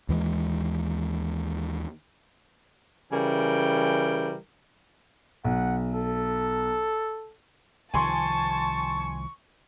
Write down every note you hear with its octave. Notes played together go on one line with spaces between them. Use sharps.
D#2 E3 G3 G#3
C#3 E3 G3 A#4 G5
B1 F#5
A4
C2 D#3 F3 G#5 A5 C6 C#6